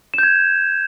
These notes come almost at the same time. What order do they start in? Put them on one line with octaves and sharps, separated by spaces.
E7 G6 G#6